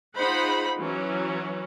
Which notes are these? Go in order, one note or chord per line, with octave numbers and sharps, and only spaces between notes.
D#4 F4 G#4 C5 F#5 B5
E3 F#3 C#4